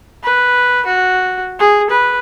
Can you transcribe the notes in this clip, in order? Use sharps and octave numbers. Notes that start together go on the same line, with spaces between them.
B4
F#4
G#4
B4